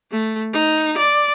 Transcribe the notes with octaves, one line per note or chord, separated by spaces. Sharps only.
A3
D#4
D5